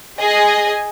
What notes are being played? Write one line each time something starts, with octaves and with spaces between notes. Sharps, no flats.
G#4 D#5 G#5